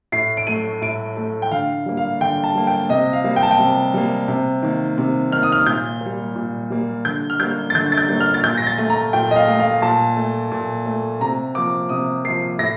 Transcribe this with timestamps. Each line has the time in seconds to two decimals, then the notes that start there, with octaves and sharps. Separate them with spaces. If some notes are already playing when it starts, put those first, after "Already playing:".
0.12 A2 C7
0.37 D7
0.47 A3 D#7
0.81 A2 D7
1.17 A3
1.42 G5
1.51 D3 F5
1.86 G3 A#3
1.97 F5
2.21 D3 G5
2.44 A5
2.55 G3 A#3
2.67 G5
2.89 C3 D#5
3.13 F5
3.24 G3 A#3
3.36 G5
3.43 A5
3.51 G5
3.59 C3
3.94 G3 A#3
4.28 C3
4.62 D#3 A#3
4.98 C3
5.32 D#3 A#3 F6
5.43 D#6
5.52 F6
5.66 A#2 G6
6.01 A#3
6.06 G3
6.36 A#2
6.70 G3 A#3
7.05 D3 G6
7.30 F6
7.40 G3 A#3 G6
7.70 A6
7.75 D3 G6
7.92 A6
7.98 G6
8.08 G3 A#3
8.20 F6
8.34 A6
8.44 A#2 G6
8.58 A#6
8.67 A6
8.78 A3
8.90 A#5
9.13 A#2 G5
9.31 D#5
9.36 F5
9.48 A3
9.59 F5
9.82 A#2 A5
10.17 A3
10.52 A#2
10.86 A3
11.20 C3 A#5
11.55 F3 A#3 D6
11.89 C3 D#6
12.24 F3 A#3 C7
12.59 A2 A#6